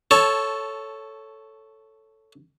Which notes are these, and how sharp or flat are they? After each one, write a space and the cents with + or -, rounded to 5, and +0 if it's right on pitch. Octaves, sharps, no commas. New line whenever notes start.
A4 +0 C#5 +0 A5 -15